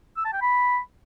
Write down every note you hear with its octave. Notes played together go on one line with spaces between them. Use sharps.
E6
A5
G5
B5